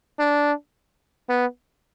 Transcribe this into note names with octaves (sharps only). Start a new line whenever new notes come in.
D4
B3